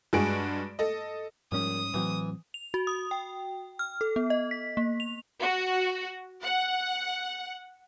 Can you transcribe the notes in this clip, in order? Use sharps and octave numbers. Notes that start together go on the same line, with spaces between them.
G2 G#3 F#4 G#4 D7
A4 D#5
A#1 G#2 G3 C#4 D#6
A2 E3 F#3 C4
F7
F#4
D#6
G5
F6
A4
B3
D#5
B6
A#3
F7
F#4
F#5